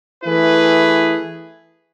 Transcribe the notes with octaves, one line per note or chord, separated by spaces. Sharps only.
E3 A3 E4 G#4 B4